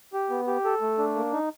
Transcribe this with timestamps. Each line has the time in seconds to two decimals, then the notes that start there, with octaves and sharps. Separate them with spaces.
0.13 G4
0.30 B3
0.47 G4
0.65 A4
0.81 A3
0.98 D4
1.15 A#3
1.32 D#4